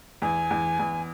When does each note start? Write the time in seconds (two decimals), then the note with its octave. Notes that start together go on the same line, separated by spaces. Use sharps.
0.22 E2 G#5
0.51 E2
0.79 E2